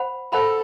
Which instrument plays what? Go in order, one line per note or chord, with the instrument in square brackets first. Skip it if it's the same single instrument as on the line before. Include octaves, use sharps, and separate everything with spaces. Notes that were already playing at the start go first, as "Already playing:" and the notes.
Already playing: [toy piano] C5 F#5 B5
[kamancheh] A4 [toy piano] C5 F#5 B5